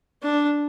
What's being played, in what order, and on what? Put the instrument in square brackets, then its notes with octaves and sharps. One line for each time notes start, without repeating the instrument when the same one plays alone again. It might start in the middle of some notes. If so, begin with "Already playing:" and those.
[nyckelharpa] D4